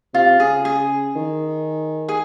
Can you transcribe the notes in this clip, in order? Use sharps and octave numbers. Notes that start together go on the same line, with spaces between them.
C3 F4
C#3 G#4
G#4
D#3
G#4